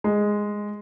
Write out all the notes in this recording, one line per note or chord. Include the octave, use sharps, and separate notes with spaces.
G#3